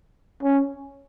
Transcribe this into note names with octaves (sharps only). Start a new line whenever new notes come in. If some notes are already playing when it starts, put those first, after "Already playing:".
C#4